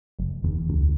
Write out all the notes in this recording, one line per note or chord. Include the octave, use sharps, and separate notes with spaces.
F#1
E2
D2